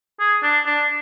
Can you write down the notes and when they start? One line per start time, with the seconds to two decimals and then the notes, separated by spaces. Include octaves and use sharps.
0.20 G#4
0.43 D4
0.66 D4